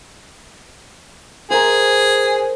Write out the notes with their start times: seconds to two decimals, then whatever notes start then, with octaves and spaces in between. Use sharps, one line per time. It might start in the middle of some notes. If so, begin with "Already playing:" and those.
1.50 G#4 A#4 C5